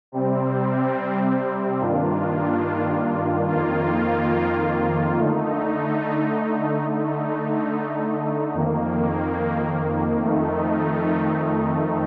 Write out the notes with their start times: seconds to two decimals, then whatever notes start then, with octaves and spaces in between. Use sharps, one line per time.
0.12 C3 G3 C4
1.80 G2 D#3 A#3 D4 F4
3.48 F2 D#3 A#3 F4
5.17 D3 A3 D#4
6.85 D3 A3 D#4
8.54 F2 D#3 A#3
10.22 F2 D#3 A3 D#4